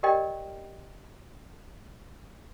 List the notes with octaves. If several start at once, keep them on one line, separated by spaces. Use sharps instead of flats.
G4 A#4 D5 D#5 G5